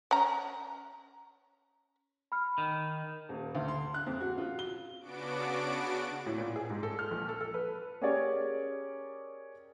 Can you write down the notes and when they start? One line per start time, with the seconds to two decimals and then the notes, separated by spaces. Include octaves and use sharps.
0.11 C#4 A#5
2.32 B5 F6
2.58 D#3
3.29 D#1
3.55 D2
3.68 C6
3.94 F#6
4.06 F2
4.21 F#4
4.38 F4
4.59 G7
5.00 C#3 B3 D4 F#4 D6 D7
6.26 A2
6.38 A#2
6.56 G#4
6.70 G#2
6.83 A4
6.99 F6
7.11 A#1
7.29 A4
7.41 A4
7.54 B4
8.02 C#4 G4 G#4 A#4 C#5 D5